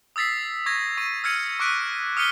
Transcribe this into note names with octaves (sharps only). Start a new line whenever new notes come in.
D#6 E6 A6 B6 C7
C#6 G#6 A#6
C#6 D#7
E6 F6 G#6 C#7 D#7
C#6 D6 F#6 B6 D7
D#6 F6 B6 C#7 D#7 G7